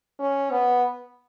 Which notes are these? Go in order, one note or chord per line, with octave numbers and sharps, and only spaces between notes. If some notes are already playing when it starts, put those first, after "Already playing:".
C#4
B3